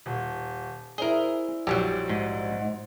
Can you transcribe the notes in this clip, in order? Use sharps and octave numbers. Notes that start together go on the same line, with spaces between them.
D#1
E4 G#4 A#4 C5 D5 G7
A#1 F#3 G3 G4
G#2